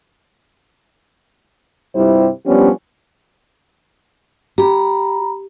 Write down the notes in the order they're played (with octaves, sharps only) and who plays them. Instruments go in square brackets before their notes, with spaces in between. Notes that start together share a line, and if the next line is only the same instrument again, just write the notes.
[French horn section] G2 C3 G3 E4 F4 C5
F3 G3 B3 C#4 D4 G4
[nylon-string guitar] G4 [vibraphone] A#5 B5